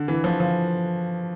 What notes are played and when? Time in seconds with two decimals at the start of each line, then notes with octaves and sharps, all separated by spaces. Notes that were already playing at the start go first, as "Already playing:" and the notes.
Already playing: D3
0.08 E3
0.24 F3
0.40 F3